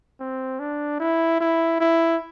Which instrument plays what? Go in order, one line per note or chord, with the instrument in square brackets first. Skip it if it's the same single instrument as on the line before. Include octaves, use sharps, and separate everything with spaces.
[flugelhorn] C4
D4
E4
E4
E4